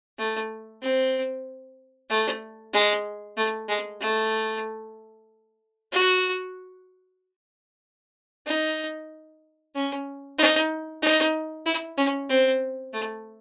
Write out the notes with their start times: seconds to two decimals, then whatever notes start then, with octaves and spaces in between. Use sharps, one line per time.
0.18 A3
0.82 C4
2.10 A3
2.73 G#3
3.37 A3
3.69 G#3
4.01 A3
5.92 F#4
8.46 D#4
9.74 C#4
10.38 D#4
11.02 D#4
11.66 E4
11.97 C#4
12.30 C4
12.93 A3